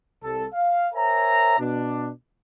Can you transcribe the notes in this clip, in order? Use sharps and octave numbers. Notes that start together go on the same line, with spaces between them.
C2 A4
F5
A#4 C5 C#5 E5 G#5 A#5
B2 D4